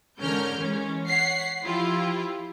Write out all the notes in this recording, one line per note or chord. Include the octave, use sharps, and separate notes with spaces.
G#2 D3 C#4 A#4 F6 G6
E3 G#3 C#4
C#5 F#5 B6 C7
F3 E4 F4 G4